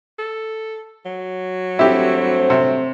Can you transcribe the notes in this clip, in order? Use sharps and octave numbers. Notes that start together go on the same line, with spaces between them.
A4
F#3
G2 A3 C4 E4 G4
C3